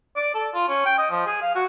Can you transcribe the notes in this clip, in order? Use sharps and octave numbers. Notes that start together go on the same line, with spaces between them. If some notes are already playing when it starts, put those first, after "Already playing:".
D5
A4
F4
C#4
G5
D#5
F3
G#4
F5
F#4